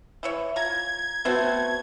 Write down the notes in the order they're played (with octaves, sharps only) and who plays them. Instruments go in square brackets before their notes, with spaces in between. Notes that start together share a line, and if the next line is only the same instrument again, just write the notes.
[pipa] E3 E4 C#5
[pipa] F4 A#5 [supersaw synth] G#6
[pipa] F#3 A3 C4 [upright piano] B3 F#4